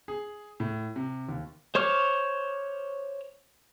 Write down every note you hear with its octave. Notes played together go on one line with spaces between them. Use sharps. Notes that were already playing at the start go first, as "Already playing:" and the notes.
G#4
A2
C3
D#2
C5 C#5 C#6 D6 F6